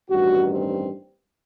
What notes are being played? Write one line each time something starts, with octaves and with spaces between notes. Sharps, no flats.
A1 G2 D#3 F#4
C4